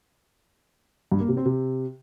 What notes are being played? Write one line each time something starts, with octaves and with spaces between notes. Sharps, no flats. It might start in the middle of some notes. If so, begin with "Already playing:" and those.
G2
A#3
C3
C4
C3